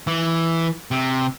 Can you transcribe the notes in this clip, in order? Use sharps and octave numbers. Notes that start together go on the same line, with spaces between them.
E3
C3